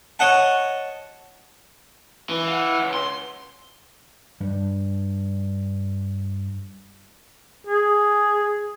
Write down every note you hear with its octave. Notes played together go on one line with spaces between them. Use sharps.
C#5 D#5 F#5 A5
E3
F5 F#5
C#2
C6
G2 G3
G#4